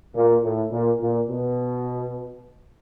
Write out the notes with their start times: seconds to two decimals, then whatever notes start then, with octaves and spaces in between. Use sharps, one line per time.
0.16 A#2
0.44 A2
0.72 A#2
1.01 A#2
1.29 B2